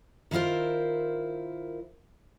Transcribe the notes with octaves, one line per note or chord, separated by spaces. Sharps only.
D#3 E4 F4 A#4 C5